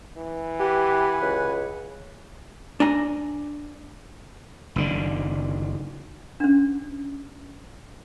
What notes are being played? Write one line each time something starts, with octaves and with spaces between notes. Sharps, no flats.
E3
G4 B4 F#5 G#5
C#2
D4 G#5 A#5
F#1 D3 D#3
C#4 D4